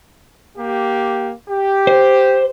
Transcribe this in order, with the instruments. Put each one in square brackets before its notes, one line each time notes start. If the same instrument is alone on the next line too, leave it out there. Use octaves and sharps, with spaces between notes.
[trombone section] A#3 G4
G4
[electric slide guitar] C5